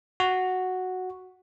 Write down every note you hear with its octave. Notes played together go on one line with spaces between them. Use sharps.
F#4